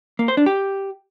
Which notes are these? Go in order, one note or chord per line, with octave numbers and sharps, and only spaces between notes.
A#3
C5
D4
G4